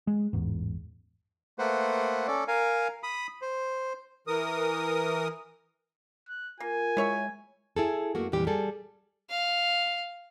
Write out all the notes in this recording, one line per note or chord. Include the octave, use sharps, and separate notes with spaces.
G#3
A1 E2 G#2
A3 A#3 B4 C5 F#5
C#4 A4 D5
A#4 F5 G#5
B5 D#6
C5
E3 A#4 D#6
F#6
A#3 F4 A#4 G#5
G#3 E4 C#5 E5
E4 G#4 A4
F#2 A3 A#3 F#4
F2 A#2 E3 G3 G4
G3 G#4 A4
F5